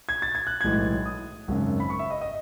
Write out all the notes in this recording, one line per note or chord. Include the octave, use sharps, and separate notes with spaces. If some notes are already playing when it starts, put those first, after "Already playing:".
G#6
A6
G#6
F#6
B1 A2 E3 G#3 G#6
D#6
G#1 F#2 C#3
B5
C#6
E5
D#5
D#5